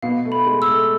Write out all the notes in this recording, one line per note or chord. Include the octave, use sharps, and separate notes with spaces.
B2 B3 F5
A3
B5
G#3
E6
A3